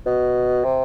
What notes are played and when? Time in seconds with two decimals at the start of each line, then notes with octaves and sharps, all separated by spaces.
0.06 B2
0.64 C3